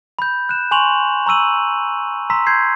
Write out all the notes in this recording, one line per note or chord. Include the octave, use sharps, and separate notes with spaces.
B5 G6
F#6 E7
G#5 C6 C#6 F7 F#7
A#5 C#6 E6 D#7 F#7
A#5 C6 E6 B6
C6 G6 G#6 C7